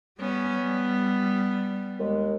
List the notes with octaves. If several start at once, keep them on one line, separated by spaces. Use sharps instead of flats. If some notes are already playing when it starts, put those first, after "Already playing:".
G3 B3 C#4
G3
D#2 G#3